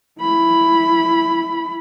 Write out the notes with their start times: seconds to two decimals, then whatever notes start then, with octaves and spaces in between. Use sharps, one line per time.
0.20 E4 B5